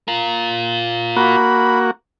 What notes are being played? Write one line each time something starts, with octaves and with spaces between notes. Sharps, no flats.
F4 A#4
A#3 F#4 B5